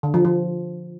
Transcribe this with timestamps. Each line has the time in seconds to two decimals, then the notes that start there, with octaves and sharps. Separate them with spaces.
0.03 D3
0.14 F3
0.25 F3